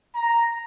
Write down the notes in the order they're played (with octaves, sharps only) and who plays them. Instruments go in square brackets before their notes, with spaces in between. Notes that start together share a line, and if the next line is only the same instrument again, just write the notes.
[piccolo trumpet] A#5